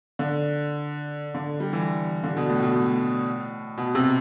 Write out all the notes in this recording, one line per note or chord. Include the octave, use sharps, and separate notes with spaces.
D3
D3
G3
E3
D3
B2
A2
B2
A2
B2
C3